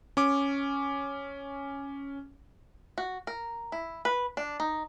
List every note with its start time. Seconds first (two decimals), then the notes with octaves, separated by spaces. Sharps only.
0.17 C#4 D6
2.98 F#4
3.27 A#4
3.72 E4
4.05 B4
4.37 D4
4.60 D#4